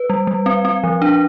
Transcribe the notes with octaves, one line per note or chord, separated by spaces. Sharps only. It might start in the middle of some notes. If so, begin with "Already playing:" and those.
Already playing: B4
G3
G3
C4
C4
F3
D4